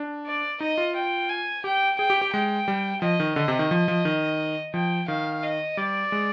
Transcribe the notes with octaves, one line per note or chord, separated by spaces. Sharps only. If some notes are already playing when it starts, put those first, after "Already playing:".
Already playing: D4
D5
D#4 D#5
F4
G5
G#5
G4 G5
G#4 G5
G4
G4
G#3 G5
G3
F3 D#5
D#3
D3 D#5
C3
D#3
F3
F3
D#3
F3 G5
D#3 F5
D#5
G3 D5
G#3